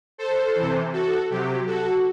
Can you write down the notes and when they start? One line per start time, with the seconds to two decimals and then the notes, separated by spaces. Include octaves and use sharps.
0.18 A4 C5
0.56 C3 E3
0.93 F#4 A4
1.30 C3 F#3 G4
1.66 F#4 A4